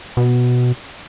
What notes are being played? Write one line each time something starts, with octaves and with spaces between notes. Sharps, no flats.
B2